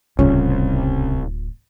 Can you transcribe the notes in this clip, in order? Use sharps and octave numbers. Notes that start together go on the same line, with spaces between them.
D1 C2 C#3 C#4 F4